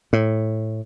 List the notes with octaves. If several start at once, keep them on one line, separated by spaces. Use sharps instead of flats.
A2